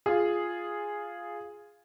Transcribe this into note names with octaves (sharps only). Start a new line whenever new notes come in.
F4 G#4